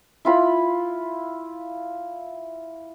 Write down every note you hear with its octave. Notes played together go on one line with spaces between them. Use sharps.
E4 F4 B5